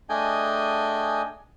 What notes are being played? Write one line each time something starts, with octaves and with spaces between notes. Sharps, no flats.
A3 D4 G#4 D#5 G5 G#5